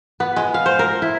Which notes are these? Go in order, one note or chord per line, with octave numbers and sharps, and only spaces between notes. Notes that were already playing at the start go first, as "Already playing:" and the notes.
B3
G#3
F5
C5
A#4
E4